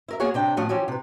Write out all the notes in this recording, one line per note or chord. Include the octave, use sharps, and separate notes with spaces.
E4 A#4 E5
A#3 B3 F#4 G#4 C#5 F#5
C3 D4 G5
A2 F3 A3 C#4 F#5
E3 F3 C#4 F#4 G4
C3 B4